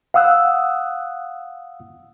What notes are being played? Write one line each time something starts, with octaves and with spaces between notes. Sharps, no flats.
F5 F#5 D#6 E6 F#6